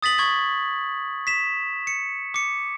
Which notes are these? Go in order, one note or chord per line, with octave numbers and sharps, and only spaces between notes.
D#6 A6 B6 F#7
C#6 G#6 F#7
B6 E7
C#7
D6 C#7